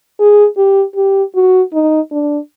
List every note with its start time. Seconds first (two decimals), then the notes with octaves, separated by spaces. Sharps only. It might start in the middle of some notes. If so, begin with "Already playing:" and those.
0.20 G#4
0.57 G4
0.96 G4
1.35 F#4
1.73 D#4
2.11 D4